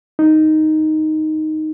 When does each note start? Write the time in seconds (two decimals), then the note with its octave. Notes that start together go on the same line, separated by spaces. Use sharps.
0.19 D#4